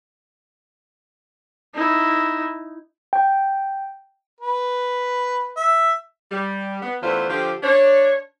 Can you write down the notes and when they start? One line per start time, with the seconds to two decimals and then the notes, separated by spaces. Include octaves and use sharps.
1.74 D#4 E4
3.13 G5
4.41 B4
5.57 E5
6.32 G3
6.82 B3
7.02 E2 E3 A3 D4 F4 C5
7.30 D3 F3 F4 G4
7.63 D4 C#5